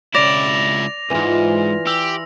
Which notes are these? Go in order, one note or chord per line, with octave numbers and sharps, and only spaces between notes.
C#2 E4 D5 A#6 F7
C2 G#2 E3 F4
G4 E6